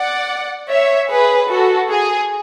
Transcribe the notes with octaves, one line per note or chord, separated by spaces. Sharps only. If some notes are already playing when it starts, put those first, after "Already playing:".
Already playing: D5 F#5
C#5 E5
G#4 B4
F#4 A4
G#4